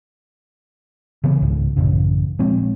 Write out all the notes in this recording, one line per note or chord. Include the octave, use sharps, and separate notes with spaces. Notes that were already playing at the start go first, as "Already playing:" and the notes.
C#3 E3 B3
C#2 G#2
A1 F#2 C#3
A#2 F3 G#3 C4